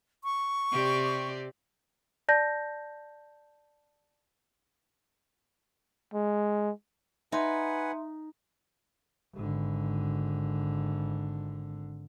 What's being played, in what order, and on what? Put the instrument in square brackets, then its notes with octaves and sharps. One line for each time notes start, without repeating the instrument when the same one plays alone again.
[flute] C#6
[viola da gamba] C3 G4 D5
[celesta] D5 A5 G6 A#6
[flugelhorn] G#3
[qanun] D#4 [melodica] B4 F#5 G#5 [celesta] E5 C6
[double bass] G#1 D3